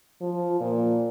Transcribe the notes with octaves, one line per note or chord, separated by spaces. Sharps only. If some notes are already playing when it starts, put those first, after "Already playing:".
F3
A#2